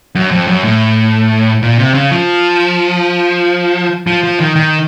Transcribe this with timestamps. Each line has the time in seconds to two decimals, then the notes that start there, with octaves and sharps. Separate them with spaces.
0.15 F#2
0.31 F2
0.47 F#2
0.64 A2
1.62 A#2
1.78 C3
1.94 C#3
2.11 F3
4.07 F3
4.23 F3
4.40 D#3
4.56 D#3